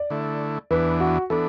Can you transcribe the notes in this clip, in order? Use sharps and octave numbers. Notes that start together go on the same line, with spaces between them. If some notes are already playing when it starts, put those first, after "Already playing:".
Already playing: D5
D3 A3 E4
E2 E3 B3 D4 B4
F#4
E3 B3 D4 A4